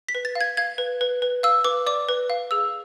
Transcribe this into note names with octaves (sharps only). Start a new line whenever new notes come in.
B6
B4
A6
F5
G#6
F5 G#6
B4
B4
B4
F5 E6
B4 D6
D5 D6
B4
F5
G#4 E6